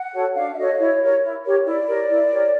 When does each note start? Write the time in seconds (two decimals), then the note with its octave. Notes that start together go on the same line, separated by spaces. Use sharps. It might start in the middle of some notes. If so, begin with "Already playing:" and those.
Already playing: F#5
0.14 F#4 A4 C#5
0.35 D4 F5
0.53 E5
0.58 F#4 A4 C#5 D#5
0.79 E4 C#5
1.01 G4 A#4 C#5
1.23 E4
1.45 G4 A#4 C#5
1.66 E4 D5
1.88 G4 A#4 C#5
2.10 E4
2.31 G4 A#4 C#5